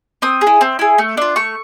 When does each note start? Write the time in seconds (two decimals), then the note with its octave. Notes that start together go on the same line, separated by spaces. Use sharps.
0.22 C4 D#6
0.41 G#4
0.47 E4
0.61 C4
0.79 E4 G#4
0.98 A3
1.17 D4 F4
1.36 A3 C#6